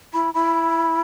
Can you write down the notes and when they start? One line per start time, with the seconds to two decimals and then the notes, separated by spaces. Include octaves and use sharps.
0.13 E4 B5
0.34 E4 B5